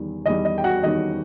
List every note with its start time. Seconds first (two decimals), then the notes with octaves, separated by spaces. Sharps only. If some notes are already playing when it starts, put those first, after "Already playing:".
Already playing: E2 D#3 G3
0.26 E2 D#3 G3 D#5
0.45 D#5
0.58 G5
0.64 F#4 F#5
0.83 E2 D#3 G3 D#5